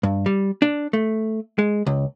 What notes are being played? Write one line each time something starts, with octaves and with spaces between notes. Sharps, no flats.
G2
G3
D4
A3
G#3
C#2